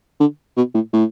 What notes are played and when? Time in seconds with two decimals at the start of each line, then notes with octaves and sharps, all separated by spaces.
0.20 D3
0.57 B2
0.74 A2
0.93 A2